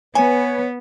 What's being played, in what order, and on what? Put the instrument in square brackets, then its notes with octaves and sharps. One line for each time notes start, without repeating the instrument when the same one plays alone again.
[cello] B3 [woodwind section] B4 C#5 [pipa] G#5